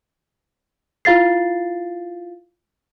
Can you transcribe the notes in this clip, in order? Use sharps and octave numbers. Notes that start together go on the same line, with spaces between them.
E4 F4 F5 A6 C7